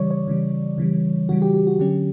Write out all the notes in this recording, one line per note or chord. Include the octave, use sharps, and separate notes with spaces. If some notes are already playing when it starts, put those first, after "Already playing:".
Already playing: C#3 E3 G3 C#5 D5
C#5
C#3 E3 G3
C#3 E3 G3
C#3 E3 G3 F#4
G4
G4
F#4
D3 F#3 C#4 G4